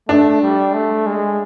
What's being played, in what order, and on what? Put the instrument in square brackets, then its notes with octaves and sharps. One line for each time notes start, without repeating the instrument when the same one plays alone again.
[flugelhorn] A3 [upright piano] D4
[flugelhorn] G3
A3
G#3